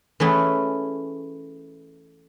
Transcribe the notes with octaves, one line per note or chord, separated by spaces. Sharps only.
E3 A3 C#4 G#4